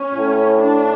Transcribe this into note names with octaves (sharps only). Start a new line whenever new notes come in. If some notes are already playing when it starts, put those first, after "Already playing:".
Already playing: C#4
A2
D4